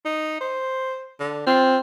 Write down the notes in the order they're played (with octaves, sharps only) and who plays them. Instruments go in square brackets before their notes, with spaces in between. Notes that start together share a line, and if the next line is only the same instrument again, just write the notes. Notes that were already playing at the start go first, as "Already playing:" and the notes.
[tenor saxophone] D#4
C5
D3
[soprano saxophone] C4 [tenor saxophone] F4